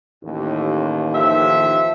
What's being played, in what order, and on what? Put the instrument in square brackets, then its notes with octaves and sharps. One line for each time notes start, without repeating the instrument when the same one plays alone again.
[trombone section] A1 D#2
[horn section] D#3 F3 E5